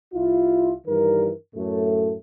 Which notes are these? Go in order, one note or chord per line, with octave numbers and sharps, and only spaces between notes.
C2 E4 F4
G2 D#3 E3 G3 A#4
F#2 A2 A3